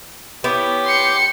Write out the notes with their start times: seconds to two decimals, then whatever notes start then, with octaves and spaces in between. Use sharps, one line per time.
0.44 B3 E4 G4 C#5
0.85 C6 C#7